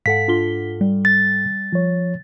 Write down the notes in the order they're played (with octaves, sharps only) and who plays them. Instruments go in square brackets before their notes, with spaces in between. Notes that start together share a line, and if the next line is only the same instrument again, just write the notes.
[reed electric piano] G#2 A4 [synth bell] F5 F#5 [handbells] B6
[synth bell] D4 F4 G7
G3
[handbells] A6
[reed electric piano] F3 C#5